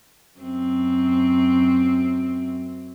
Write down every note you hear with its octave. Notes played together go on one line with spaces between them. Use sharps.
F#2 C4